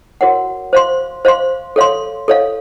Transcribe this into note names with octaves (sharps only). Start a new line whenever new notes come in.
F#4 A#4 C#5 F#5
C5 F5 C6
C5 F5 C6
A4 C#5 F5 C6
A4 C#5 F5